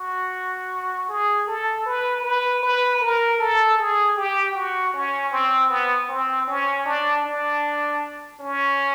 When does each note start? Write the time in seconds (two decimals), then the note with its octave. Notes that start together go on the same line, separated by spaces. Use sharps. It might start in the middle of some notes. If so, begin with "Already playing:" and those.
Already playing: F#4
1.09 G#4
1.48 A4
1.86 B4
2.24 B4
2.63 B4
3.01 A#4
3.39 A4
3.78 G#4
4.16 G4
4.55 F#4
4.94 C#4
5.32 C4
5.70 B3
6.09 C4
6.48 C#4
6.86 D4
7.25 D4
8.40 C#4